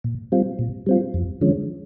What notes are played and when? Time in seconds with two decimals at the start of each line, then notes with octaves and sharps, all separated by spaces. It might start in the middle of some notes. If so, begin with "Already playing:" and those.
0.04 A#2
0.32 G3 C4 F4
0.59 A#2
0.86 G3 C4 F4
1.14 F2
1.41 D3 F3 G#3 C#4